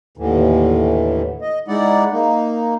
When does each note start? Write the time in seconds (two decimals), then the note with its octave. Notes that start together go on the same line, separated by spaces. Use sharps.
0.17 D#2 A2 D3 E3
1.41 D#5
1.68 G#3 D#4 E4 D5 F#5
2.11 A#3 D#4